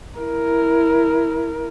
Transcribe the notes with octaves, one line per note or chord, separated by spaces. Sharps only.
E4 A#4